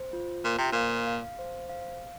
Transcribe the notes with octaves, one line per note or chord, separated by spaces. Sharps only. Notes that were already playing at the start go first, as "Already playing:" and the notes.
Already playing: C5
F4
A#2 C5
C3
A#2 F5
F5
C5
F5
F5